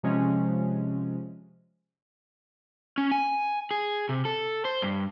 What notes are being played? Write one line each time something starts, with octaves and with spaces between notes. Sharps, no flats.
C3 F3 G#3 C#4
C#4
G#5
G#4
C3
A4
C5
G2